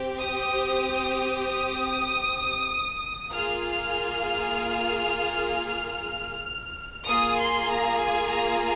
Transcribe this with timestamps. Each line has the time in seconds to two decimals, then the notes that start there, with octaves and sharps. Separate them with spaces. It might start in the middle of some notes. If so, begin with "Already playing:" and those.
Already playing: C4 G4
0.20 D#6
1.45 D#6
3.32 A#3 F4 G#4 F6
7.07 A#3 F4 G#4 D#6
7.39 C6
7.70 A#5
8.01 G#5
8.32 A#5